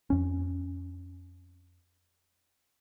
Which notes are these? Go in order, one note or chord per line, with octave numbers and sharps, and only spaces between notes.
F2 C#4